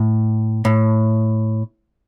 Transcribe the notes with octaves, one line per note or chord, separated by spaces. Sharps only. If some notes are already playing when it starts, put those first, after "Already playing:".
Already playing: A2
A2